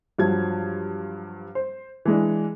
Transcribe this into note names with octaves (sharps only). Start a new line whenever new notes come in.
G2 F3 F#3 G#6
C5
E3 G#3 D4